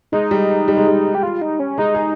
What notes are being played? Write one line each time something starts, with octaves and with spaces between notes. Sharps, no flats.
G#3 D#4
G3
G3
G#3
G3
G4
F4
D#4
C#4
G#3 D#4
G#4